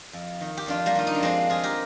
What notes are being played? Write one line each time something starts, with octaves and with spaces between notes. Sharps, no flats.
F2
D#3
G4
F2 D4 F4
G3 A#3
D#3 F4
D#4
D4
F2 G#3 C4
D#3 F4 G#4
G4 A#4